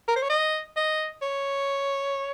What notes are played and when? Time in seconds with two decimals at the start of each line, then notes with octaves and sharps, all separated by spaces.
0.08 A#4
0.16 C5
0.22 C#5
0.30 D#5
0.76 D#5
1.22 C#5